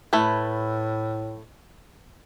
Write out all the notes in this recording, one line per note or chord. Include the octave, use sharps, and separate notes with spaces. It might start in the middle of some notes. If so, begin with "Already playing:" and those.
A2 A3 E4 B4